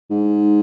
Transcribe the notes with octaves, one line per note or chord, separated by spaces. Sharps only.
G#2